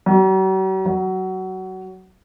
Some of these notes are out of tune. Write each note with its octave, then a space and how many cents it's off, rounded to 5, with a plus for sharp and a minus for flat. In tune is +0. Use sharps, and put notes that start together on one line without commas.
F#3 +45
F#3 +20